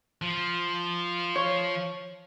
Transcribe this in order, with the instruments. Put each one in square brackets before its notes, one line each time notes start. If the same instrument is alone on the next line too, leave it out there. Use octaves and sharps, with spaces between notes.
[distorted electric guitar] F3
[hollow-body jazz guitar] C#5